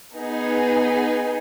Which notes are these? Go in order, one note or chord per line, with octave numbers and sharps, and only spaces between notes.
B3 D#4 G#4